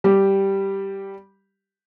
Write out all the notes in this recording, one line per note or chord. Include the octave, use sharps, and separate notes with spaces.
G3 G4